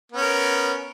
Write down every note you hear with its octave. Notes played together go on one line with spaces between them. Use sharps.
B3 C#4 A#4